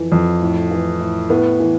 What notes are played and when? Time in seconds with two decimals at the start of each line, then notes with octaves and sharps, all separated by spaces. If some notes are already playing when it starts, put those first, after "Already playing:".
Already playing: F2 E3
0.12 F2
0.41 A2
0.71 E3
1.01 A2
1.30 A2 B3
1.60 E3